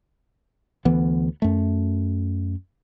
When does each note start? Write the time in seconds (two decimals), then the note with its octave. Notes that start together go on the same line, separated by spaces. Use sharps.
0.85 D2 E3 B3
1.42 F#2 A3